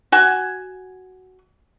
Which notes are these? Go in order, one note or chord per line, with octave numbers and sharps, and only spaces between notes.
F#4 G#5